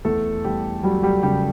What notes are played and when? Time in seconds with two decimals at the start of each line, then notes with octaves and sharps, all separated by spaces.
0.05 E2 A3 A4
0.44 E2 G3 G4
0.83 F#3 G3 G4
1.03 G3 G4
1.23 C#3 G3 G4